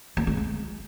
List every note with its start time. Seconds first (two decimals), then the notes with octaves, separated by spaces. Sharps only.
0.17 A#3
0.27 G#3
0.37 G#3